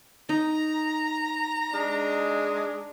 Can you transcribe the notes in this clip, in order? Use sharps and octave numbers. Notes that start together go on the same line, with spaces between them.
D#4 A#5
G#3 D4